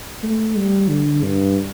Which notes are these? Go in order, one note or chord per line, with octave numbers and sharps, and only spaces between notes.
A3
G3
D3
G2